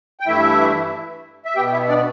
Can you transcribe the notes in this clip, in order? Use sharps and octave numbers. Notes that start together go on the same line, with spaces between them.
G5
G2 E3 A3 E4 E5
E5
B2 B3 G4 G5
E4 E5
D4 D5